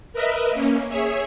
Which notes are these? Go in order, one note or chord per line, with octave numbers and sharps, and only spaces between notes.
A#4 B4 D#5 E5
A#3 C#4
G#4 C#5 E5